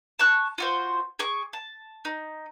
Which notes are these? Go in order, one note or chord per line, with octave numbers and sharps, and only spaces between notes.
A5 C#6 F#6
F4 F#4 C5
G#4 C#6 D6
A5
D#4